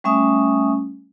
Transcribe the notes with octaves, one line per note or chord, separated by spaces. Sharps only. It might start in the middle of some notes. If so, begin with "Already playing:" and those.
G3 A3 C#4 E5 G#5 D#6